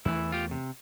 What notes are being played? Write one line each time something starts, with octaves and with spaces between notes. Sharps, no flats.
E2 E3 A3 E4
F4 G4
C3